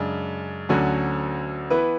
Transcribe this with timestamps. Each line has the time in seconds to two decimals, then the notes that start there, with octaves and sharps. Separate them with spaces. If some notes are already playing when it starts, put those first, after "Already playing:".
Already playing: F#2 C#3 G#3 D4
0.69 D2 D3 F#3 C#4 F#4
1.70 E3 B3 E4 B4